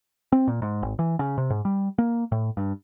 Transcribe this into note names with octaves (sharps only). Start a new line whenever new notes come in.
C4
A#2
G#2
G#1
E3
C#3
C3
G#2
G3
A#3
A2
G2